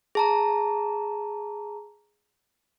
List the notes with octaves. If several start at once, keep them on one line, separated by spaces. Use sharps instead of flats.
G#4 A5 A#5